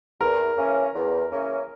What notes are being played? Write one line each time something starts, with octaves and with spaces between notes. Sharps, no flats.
E2 A#4
C#3 E3 A#3 C#4
E2
C#3 E3 A#3 C#4